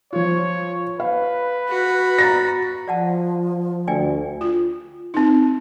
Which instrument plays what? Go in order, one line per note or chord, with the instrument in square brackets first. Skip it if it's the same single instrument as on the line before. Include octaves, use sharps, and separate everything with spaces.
[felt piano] F3 F4 [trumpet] C#5
[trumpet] B4 [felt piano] F5
[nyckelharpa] F#4 B5
[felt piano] A#5 A6 A#6
[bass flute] F3 [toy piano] D5 F#5 A5
[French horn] D2 [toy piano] D5 G5 G#5
[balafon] F4
C4 D#4